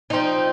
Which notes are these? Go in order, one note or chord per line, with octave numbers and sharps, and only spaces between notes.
F3 C4 D#4